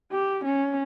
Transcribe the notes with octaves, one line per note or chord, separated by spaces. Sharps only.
G4
C#4